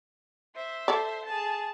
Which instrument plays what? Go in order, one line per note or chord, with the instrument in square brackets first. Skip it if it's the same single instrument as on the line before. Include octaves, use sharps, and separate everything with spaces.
[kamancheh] C5 E5
[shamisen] A4 D5
[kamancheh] G#4 A5